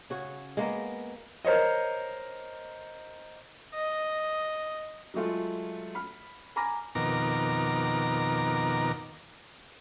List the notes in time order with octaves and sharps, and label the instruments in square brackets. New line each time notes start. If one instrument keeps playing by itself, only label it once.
[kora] C#3 F#4 C#5
G#3 A#3 B3
[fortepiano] A#4 C5 C#5 D#5
[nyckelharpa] D#5
[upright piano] F#3 G#3 A3 F4
B5 F6
G#5 A#5 B5 D6 F6 A#6
[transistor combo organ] F2 B2 D#3 A#4 A#5 D6